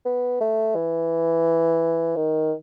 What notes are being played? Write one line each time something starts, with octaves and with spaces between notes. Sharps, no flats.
B3
A3
E3
D#3